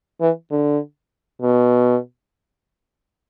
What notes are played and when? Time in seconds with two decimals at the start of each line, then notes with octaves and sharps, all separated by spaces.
0.21 E3
0.51 D3
1.42 B2